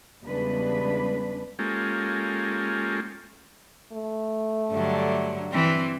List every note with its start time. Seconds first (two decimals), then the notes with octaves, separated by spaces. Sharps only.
0.24 E2 C#3 G3 G#3 D4 B4
1.59 G#3 A#3 C#4 F4 G4 A4
3.92 A3
4.72 G2 D3 F#3
5.52 E3 C4